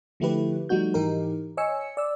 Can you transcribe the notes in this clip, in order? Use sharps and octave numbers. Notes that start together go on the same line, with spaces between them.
D3 F3 A3 E4 G4 B4
F3 G3 A3 D#4 F#4 G6
G#2 E3 D#4 G4 A#4
C#5 D#5 G#5 E6 C#7
D5 E6